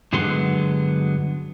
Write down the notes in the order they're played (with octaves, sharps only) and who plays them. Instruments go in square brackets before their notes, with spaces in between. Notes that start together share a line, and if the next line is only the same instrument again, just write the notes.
[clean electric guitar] G2 D3 F#3 G#3 B3 C6